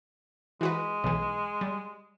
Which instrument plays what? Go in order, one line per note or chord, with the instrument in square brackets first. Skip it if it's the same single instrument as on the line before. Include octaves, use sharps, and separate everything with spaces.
[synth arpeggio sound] E3 F#4 B4 [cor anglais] G#3
[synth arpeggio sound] B1 E3
G3